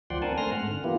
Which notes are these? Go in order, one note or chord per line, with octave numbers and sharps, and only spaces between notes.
D2 F3 D5 F#5 G5 C6
C4 D4 A#4 F#5 G#5 A5
A3 C4 G#5 C6 F6 A#6
G#2 F#5 F6
D3
E3 A#3 B3 E4 F4 G4